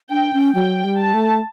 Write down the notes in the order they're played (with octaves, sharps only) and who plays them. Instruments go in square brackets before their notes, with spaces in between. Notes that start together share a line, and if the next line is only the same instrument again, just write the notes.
[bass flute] D4 [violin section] G5
[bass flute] C#4
[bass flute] F#3 [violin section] G5
[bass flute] G3
[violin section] A5
[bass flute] A3